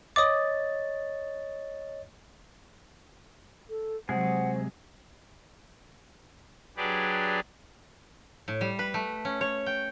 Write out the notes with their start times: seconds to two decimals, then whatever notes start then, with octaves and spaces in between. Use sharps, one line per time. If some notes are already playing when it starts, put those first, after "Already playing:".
0.16 C#5 D#5 D6 D#6 A6
3.70 A4
4.09 C3 F#3 G#3 G#4 C5 F#5
6.77 F#3 D4 G4 G#4 B4 D5
8.48 A2
8.61 G3
8.79 B4
8.94 A3
9.25 C#4
9.41 C#5
9.66 G5